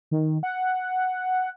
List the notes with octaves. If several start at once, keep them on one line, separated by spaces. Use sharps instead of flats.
D#3
F#5